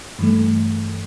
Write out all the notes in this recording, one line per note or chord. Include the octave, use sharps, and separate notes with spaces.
G2 E3 A3